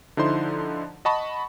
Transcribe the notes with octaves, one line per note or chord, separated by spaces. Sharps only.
D3 F3 D#4 E4 C5 C6
D#5 F#5 A5 B5 C#6